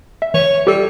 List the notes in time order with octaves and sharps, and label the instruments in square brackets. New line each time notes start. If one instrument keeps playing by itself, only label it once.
[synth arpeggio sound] E5
[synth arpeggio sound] E3 [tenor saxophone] C#5
[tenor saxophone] G3 [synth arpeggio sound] G4 A4